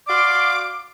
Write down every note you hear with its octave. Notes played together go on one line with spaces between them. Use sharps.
F#4 D5 F5 C6 D6